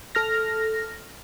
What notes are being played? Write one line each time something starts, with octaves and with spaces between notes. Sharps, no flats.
A4 F6 A#6